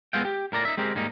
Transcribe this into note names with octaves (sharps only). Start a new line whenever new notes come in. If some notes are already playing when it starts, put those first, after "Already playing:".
G#3 B3 C4 F4 F5 G5
G4
A2 A#4 D5 A#5
D#4 E5
G#3 C4 G4 A#4
G#2 G3 A#3 D#4